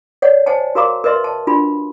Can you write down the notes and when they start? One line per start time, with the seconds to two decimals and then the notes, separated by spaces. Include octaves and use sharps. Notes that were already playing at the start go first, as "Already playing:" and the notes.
0.22 C#5 D5 F#5
0.46 C5 D#5 F#5 G#5 A5
0.75 F#4 A#4 F5 A#5 D6
1.04 A#4 B4 D#5 E5 C6
1.24 A5
1.47 D4 F4 F#4 B5